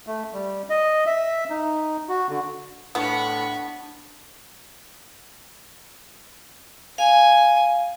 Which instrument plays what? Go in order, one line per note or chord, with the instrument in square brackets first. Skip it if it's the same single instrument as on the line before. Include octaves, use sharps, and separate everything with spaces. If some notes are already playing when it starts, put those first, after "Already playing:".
[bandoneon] A3
G3
D#5
E5
D#4
F#4
D3
[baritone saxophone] A2 [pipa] B3 [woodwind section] D4 [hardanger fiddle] B5 C#6
[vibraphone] F5 [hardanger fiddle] G#5